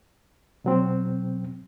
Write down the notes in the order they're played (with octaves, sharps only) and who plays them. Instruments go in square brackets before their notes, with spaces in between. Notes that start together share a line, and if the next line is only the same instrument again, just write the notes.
[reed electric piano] B2 F#3 C4